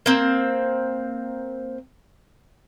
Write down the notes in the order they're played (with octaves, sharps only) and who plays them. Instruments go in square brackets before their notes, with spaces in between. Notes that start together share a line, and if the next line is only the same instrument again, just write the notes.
[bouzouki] A#3 C4